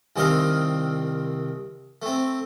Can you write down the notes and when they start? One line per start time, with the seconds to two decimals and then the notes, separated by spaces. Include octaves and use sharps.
0.16 C2 C3 D#3 C4 D#5 F5
2.02 A3 C4